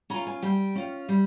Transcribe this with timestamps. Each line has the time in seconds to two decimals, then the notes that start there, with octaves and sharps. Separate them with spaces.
0.10 C#4 A#5
0.14 F4
0.27 G#5
0.43 G3 G5
0.75 C#4 F4
1.09 G3